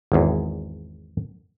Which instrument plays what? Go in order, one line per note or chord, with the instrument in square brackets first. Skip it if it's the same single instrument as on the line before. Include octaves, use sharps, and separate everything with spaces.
[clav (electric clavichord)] G#1 E2